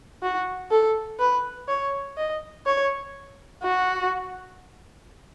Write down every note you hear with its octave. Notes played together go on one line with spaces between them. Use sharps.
F#4
A4
B4
C#5
D#5
C#5
F#4